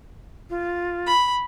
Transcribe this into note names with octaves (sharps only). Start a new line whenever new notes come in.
F4
B5